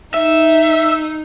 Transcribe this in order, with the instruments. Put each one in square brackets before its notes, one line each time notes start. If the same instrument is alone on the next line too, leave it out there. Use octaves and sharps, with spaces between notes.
[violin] D#4 [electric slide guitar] E5